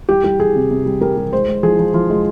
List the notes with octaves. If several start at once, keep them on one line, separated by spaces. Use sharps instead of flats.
G3 G4
G3 G4
G3 G#4
C3
C3
G3
G3 A#4
G3
G#3 C5
G#3
F3 G#4
F3
F3 F4
G#3